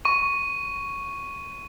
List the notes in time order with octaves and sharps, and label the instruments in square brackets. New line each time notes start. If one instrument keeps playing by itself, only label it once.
[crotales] C#6 D#7